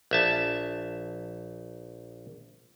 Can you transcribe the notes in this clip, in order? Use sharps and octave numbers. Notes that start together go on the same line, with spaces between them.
A#1 E5 A5